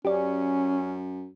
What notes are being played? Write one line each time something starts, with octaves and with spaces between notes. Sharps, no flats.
F#2 C#4 G4 D5